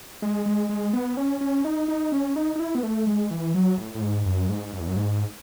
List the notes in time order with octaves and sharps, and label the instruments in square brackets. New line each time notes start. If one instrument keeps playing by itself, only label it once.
[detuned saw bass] G#3
G#3
G#3
B3
C#4
C#4
D#4
D#4
C#4
D#4
D#4
E4
B3
A3
G#3
E3
F#3
A2
A2
G#2
F#2
G#2
F#2
E2
F#2
G#2